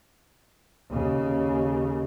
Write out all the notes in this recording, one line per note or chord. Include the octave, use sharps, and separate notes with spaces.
D#2 C#3